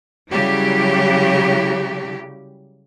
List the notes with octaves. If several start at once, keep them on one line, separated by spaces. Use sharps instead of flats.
C#3 F#3 G3 E4 G4